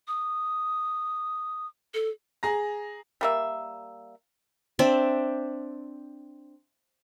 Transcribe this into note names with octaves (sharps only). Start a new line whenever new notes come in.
D#6
A4
G#4 A#5 A#6
G3 A#3 E5
C4 D4 D5 E5